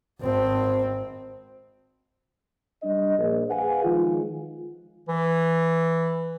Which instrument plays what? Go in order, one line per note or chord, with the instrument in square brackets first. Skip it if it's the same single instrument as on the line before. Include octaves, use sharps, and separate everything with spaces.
[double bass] G#1 C4
[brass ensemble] G3 D4 D#5
A#1
G#4 B4 F5 F#5 G#5
D#3 F3 G#3 F4
[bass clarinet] E3